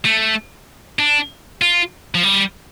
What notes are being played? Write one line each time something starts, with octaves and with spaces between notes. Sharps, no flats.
A3
D4
F4
F3
G3